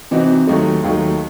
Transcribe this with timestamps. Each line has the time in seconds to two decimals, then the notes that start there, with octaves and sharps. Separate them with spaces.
0.11 C3 E3 C4 D#4 F#4
0.47 D#2 D#3 F#3 A3 D#4
0.84 D#2 D#3 F#3 A3 D#4